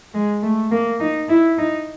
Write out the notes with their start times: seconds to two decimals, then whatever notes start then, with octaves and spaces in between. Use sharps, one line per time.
0.14 G#3
0.43 A3
0.71 A#3
1.00 D#4
1.29 E4
1.58 D#4